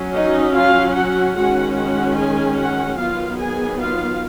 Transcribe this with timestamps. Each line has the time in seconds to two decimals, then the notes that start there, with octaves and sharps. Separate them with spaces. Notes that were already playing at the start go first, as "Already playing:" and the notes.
Already playing: F#3 C#4
0.14 D#4 D#5
0.55 F4 F5
0.96 F#4 F#5
1.36 D#3 G#3 C#4 F#4 F#5
1.76 F#4 F#5
2.17 G#4 G#5
2.58 F#4 F#5
2.98 D#3 F#3 B3 F4 F5
3.39 G#4 G#5
3.80 F4 F5